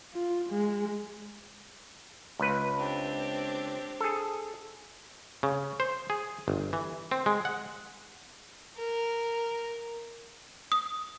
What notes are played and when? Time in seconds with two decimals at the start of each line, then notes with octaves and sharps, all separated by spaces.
0.14 F4
0.49 G#3
2.39 C#2 B4
2.78 C4 D4 G4
4.00 G#4 A4
5.43 C#3
5.80 C5
6.10 G#4
6.48 G1
6.73 E3
7.11 C4
7.26 G#3
7.45 F#5
8.77 A#4
10.72 D#6